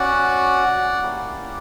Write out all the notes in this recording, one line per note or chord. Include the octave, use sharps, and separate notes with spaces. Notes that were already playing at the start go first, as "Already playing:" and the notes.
Already playing: C#4 F#4 D5 F#5
A#3 C#4 E4 G4